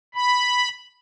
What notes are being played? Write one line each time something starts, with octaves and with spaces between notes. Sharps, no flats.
B5